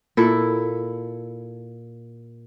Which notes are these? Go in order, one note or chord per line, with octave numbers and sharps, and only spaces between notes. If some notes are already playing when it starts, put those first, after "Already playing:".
A#2 E4 A4